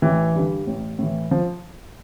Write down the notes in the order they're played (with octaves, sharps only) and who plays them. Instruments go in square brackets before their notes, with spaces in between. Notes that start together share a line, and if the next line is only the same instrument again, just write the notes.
[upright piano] A1 E3
G2 D3
A1
A2 E3
F3